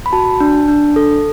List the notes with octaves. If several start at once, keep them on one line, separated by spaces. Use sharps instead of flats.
B5
F#4 A5
D4
D4
A4